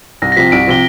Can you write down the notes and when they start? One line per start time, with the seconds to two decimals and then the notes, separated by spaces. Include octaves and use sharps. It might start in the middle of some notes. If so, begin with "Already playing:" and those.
0.22 C2 A#6
0.32 A#6
0.37 C3 F3 B6
0.52 C2 D7
0.67 C3 F3 G7